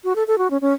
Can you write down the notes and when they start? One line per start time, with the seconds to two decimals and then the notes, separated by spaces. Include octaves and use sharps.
0.04 F#4
0.16 A4
0.28 A4
0.38 F#4
0.51 C#4
0.61 C#4